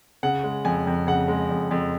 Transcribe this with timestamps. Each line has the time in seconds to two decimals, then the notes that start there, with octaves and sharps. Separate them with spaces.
0.23 C#3 F#5
0.44 G#3
0.65 F2 G#5
0.87 F2
1.07 C#3 F#5
1.28 G#3
1.50 F2
1.71 F2